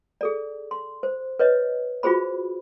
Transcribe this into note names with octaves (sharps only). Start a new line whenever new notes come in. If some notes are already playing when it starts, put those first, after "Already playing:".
G#4 A4 D5
C6
C5
B4 C#5 D#5
F4 F#4 G#4 C5 B5